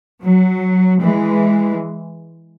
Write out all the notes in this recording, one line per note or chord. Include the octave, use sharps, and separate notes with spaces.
F#3
E3 G#3